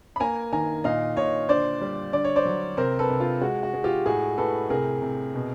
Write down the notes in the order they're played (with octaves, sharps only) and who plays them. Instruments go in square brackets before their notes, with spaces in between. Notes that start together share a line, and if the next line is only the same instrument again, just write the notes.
[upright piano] B5
A#3 G#5 A#5
D#3 G#5 A#5
A#2 D#5 F5
A#2 C#5 D#5
D3 C5 D5
G3
D3 D5
C#5
C5 D5
F#3
C3 A#4 C5
A4 B4
C3
F4
G#3 F#4
F#4
G#3
F4 G4
A2 F#4 G#4
A2 A4 B4
C3 G#4 A#4
C3
B2